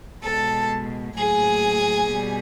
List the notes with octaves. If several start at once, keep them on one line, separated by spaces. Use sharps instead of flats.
B2 G#3 A4 A5
A2 F#3 A#3 G#4 G#5
B2 G3